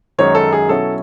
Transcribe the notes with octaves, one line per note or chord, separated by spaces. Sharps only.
F#2 D#3 G#3 D#4 C#5
A4
G#4
B2 F#3 C#4 E4 A4